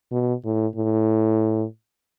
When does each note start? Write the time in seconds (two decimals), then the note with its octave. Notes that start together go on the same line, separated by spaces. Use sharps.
0.12 B2
0.44 A2
0.76 A2